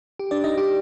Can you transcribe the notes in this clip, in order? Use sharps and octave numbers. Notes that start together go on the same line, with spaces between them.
G4
D4 D5
D#4 D#5
G4